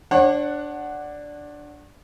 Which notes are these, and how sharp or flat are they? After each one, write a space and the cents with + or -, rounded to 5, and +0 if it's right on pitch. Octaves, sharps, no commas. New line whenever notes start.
D4 +0 C#5 -40 F#5 +0